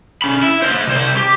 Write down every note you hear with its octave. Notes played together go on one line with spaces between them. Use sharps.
C#4 B5
E4
C5 D#5
C2 C5
G4